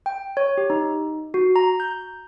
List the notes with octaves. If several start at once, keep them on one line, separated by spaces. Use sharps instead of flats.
G5
C#5
G4
D#4
F#4
A#5
G6